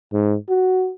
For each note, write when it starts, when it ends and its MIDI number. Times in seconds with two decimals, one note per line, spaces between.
0.13 0.36 44
0.49 0.92 66